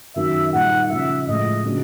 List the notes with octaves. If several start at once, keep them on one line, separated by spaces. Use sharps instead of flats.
F#2 D#3 F#3 E5
A#2 G3 A#3 D#4 F#5
C#3 F3 A#3 C#4 E5
A2 F3 G#3 D#5
C#3 F3 A#3 D4 F#4